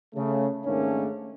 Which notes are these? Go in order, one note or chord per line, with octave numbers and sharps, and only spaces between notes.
C#3 A3
G#2 D#3 A3 A#3 C#4 D4